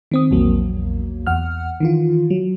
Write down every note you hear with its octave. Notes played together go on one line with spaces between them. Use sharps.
D#3 C4 D#6
A#1 E2 F#3 A#3
E2 F#5 F6
D#3 E3 F4
F#3